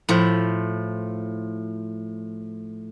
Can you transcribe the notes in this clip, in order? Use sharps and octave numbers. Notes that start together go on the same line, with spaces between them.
A2 F3